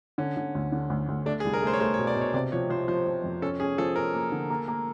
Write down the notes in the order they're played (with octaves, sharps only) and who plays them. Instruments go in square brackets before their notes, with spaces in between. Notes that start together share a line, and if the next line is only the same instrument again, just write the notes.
[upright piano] D3 [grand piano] C#4
[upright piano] D3
D2
D3
D2
D2
[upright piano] A3 [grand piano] D4
[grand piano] G#4
[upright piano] C2
[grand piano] A#4
[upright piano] A3 [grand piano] C5
[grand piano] C#5
[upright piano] A3 [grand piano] C5
[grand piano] C#5
[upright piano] B2
[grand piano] D5
[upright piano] B2
[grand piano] C#5
[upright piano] C3 [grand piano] D5
[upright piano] F3 [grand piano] C#5
[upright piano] F3 [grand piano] C5
[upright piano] F3 [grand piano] C5
[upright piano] F3
F2
[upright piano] C#4 [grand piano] A4
[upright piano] C#4 [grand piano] G#4
[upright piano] F3 [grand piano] A4
[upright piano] C#4 [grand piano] A#4
[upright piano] A#3
D3
A#3
A#3